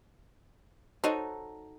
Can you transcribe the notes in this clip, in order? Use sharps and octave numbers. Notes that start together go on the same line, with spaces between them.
D#4 F#4 A4 C5 C#5 D#5